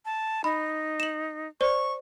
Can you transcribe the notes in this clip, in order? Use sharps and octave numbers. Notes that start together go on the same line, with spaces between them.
A5
D#4 B5
E7 F#7
C5 D5 C#6